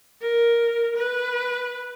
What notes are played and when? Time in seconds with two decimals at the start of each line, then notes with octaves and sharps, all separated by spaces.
0.22 A#4
0.97 B4